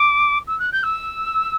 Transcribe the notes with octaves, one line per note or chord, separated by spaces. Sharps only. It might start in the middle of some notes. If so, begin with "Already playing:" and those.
Already playing: D6
E6
F#6
G6
E6